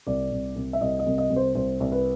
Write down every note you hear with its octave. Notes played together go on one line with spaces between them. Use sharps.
C2 D5
C2
C2
E5
C2 D#5
D#5
C2
D#5
C2
C5
C2 C5
C2
B4